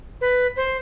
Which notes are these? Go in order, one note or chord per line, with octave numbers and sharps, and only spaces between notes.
B4
C5